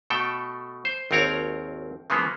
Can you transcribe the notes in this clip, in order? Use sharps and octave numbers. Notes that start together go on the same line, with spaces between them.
B2 A3 A4 G5
C5
G#1 D#2 C4 A#4 C#5 A#5
C#3 E3 F3 G#3 A#3 B3